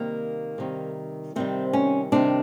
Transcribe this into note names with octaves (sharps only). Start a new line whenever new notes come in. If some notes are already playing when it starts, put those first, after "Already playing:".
Already playing: C3 D#3 G3 A#3
C3 D#3 G3
C3 D#3 G3 C4
C#4
C3 D#3 G3 D4